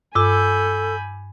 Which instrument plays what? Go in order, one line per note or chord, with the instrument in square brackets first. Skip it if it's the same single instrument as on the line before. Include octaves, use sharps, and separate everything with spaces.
[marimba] G2 [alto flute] A4 [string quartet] G#5 B5 G6 [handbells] D6 E6